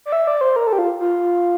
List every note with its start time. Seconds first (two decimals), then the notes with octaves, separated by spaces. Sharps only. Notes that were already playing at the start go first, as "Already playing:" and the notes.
0.06 D5
0.12 E5
0.27 D5
0.41 C5
0.56 A#4
0.67 A4
0.73 G4
0.79 F4
1.00 F4